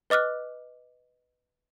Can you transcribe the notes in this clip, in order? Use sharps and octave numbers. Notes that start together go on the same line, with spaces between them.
B4 D#5 D6 F6 F#6